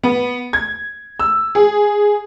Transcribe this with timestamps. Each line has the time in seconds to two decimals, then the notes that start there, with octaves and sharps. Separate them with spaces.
0.04 B3
0.53 G#6
1.20 E6
1.55 G#4